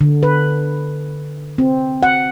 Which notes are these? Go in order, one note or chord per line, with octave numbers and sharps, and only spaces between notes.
D3
B4
C4
F#5